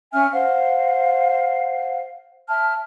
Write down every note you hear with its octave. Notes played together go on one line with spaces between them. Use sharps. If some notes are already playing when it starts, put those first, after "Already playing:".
C#4 E5 G#5 F6
C5 F5 F#5
E5 A5 F6